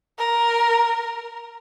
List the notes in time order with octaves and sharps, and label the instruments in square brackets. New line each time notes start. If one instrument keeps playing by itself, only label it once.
[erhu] A#4